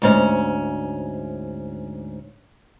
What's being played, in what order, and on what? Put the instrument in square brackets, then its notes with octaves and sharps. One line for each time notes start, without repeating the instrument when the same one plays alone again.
[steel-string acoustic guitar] D2 G#2 C#4